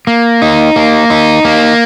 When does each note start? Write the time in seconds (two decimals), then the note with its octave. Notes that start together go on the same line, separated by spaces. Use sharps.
0.07 A#3
0.42 D#4
0.76 A#3
1.10 D#4
1.45 A#3